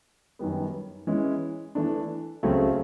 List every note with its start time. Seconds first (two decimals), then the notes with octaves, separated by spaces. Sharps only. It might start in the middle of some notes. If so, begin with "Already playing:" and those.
0.39 F#2 D#3 G3 B3
1.07 E3 G#3 C#4
1.75 E3 A3 D4
2.43 C#2 C#3 F#3 A3 C4